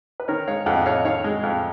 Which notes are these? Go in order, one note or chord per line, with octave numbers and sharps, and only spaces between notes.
B4
D#3 A#4 C#5
G#3 C#5 F5
F2 D#5 F#5
D#5
F2 C#5 F5
D#3 C#5 F5
G#3
F2